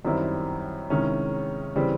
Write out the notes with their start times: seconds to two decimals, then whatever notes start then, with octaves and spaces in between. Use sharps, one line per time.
0.05 F#2 D#3 G3 C4 E4
0.90 C3 D#3 G#3 C#4 E4
1.76 C#3 E3 G3 C4